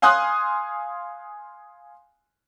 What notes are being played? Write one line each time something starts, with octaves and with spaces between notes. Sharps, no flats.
F5 G#5 C6 D#6 F#6